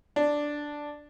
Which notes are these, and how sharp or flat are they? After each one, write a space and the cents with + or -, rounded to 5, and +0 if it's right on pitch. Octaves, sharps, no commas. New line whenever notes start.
D4 +0